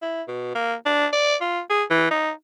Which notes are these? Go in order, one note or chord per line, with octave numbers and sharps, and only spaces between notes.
E4
B2
A#3
D4
D5
F4
G#4
E3
D#4